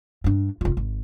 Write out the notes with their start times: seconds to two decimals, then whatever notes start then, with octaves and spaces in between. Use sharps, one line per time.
0.24 G2 D4
0.61 F1 F4
0.77 G#1